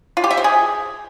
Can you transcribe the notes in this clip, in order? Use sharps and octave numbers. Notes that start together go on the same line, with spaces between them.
F4
G4
E5
C5
G#4